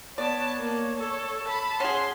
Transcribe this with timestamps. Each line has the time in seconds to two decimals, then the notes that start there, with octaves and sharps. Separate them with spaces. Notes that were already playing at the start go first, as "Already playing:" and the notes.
0.18 B3 C#5 D5 A5
0.57 A#3
0.97 A4
1.46 A5 B5
1.80 C#4 G#4 F#5 C6